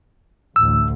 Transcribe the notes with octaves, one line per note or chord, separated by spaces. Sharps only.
A1 D2 E6